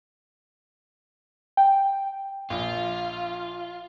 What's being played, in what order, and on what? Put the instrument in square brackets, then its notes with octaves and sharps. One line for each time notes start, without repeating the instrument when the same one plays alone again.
[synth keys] G5
[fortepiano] A#1 [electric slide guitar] F4